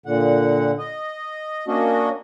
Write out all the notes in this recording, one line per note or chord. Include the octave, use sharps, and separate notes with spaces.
A#2 D3 F#5
D#5
A#3 C#4 D4 F#4 D#5